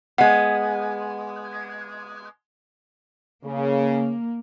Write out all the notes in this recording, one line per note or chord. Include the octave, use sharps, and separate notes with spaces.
G#3 B3 F#5
C#3 A#3